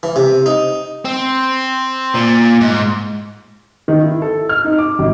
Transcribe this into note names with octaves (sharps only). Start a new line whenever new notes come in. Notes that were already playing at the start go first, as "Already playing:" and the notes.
E3
C3
D#4
C4
A#2
G#2
D#3
E4
A4
F6
D#4
D6
G#1